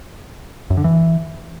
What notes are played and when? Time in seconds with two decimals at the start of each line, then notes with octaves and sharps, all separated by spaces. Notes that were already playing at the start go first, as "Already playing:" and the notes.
0.70 F#2
0.77 D3
0.84 E3